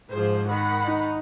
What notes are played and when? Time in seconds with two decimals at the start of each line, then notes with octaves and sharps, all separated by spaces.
0.11 G#2 F3 G#4 C5
0.48 D#3 F#5 B5
0.86 D#4